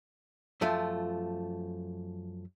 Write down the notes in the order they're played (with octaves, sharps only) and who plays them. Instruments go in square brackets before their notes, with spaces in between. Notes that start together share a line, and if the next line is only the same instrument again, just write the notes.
[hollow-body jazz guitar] F#2 F3 A3 F4